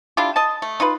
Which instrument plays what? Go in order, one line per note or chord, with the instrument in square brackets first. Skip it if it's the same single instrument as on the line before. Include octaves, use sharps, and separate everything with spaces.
[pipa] D4 E4 F4 G4
D#5 A5
A3
D#4 F4 B4